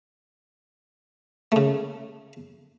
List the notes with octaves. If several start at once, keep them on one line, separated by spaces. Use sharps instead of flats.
C#3 A3